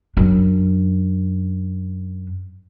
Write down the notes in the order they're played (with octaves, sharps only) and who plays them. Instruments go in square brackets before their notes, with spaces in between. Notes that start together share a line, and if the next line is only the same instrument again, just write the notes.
[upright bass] F#2 D4